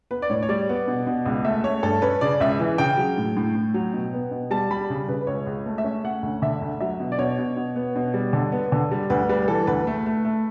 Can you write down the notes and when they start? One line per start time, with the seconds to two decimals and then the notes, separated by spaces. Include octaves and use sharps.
0.11 B3 B4
0.22 D5
0.30 A2 C#5
0.43 C#5
0.49 G3 D5
0.69 B3
0.88 B2
1.07 B2
1.26 C#2
1.44 A3 E5
1.64 A3 C#5
1.83 G2 A4
2.02 C#4 B4
2.21 C#3 D5
2.40 C#2 E5
2.59 E3
2.78 C#3 G5
2.97 F#3
3.18 A2
3.37 A2
3.55 A2
3.74 F#3
3.93 B2
4.13 B3
4.31 B2
4.51 G3 A5
4.71 G3 B5
4.90 C#3
5.09 C#3 B4
5.21 B4
5.27 C#2 C#5
5.47 C#2
5.66 A3
5.78 E5
5.84 C#4
6.04 A3 F#5
6.23 D2
6.42 D3 E5
6.61 D2
6.80 F#3 E5
7.00 B2
7.12 D5
7.19 B2 C#5
7.38 B2
7.57 B2
7.76 B3
7.96 B2
8.14 G3
8.33 D3
8.52 B3
8.72 D3
8.92 G3
9.10 D2 B4
9.29 G3 B4
9.48 E3 A4
9.67 D2 B4
9.87 A3
10.06 A3
10.25 A3